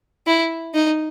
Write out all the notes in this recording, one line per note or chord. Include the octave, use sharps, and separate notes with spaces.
E4
D#4